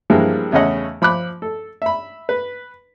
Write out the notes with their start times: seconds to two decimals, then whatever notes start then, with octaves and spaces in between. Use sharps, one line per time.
0.10 E3 F3 G3 G#3 A#3 D4
0.52 E2 C#3 A3 C#4 D#5 F#5
1.02 F3 B5 D6 F#6
1.42 A4
1.82 E5 B5
2.29 B4